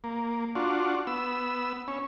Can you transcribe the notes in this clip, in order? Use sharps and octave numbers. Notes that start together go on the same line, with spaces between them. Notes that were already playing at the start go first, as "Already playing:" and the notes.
A#3
D4 F4 F#4
B3 E6
C#4